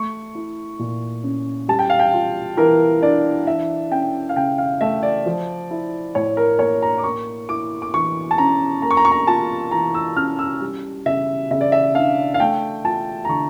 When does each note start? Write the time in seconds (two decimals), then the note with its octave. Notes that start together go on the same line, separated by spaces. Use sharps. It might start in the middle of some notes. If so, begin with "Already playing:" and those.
Already playing: A3 C#6
0.35 E4
0.79 A#2
1.24 C#4
1.68 G3 A5
1.79 G5
1.90 F5
1.99 G5
2.13 F4
2.57 E3 A#4
3.02 D4 D5
3.47 E3 E5
3.91 C#4 G5
4.29 F5
4.36 C#3 G5
4.58 F5
4.81 A3 E5
5.03 D5
5.26 F3
5.71 E4
6.15 A2 C#5
6.37 A#4
6.59 A#3 C#5
6.82 A#5
6.98 D6
7.04 A#3 C#6
7.49 E4 D6
7.82 D6
7.94 E3 C#6
8.31 A5
8.38 C#4 A#5
8.82 A#3 A#5
8.91 C#6
8.97 A#5
9.05 C#6
9.12 A#5
9.27 F4 A5
9.71 E3 A#5
9.94 E6
10.17 C#4 F6
10.39 E6
10.61 G3
11.06 C#3 E5
11.51 C#3 E5
11.61 D5
11.72 E5
11.95 D4 F5
12.34 F5
12.40 A3 G5
12.85 F4 A5
13.25 A#5
13.29 D3 C#6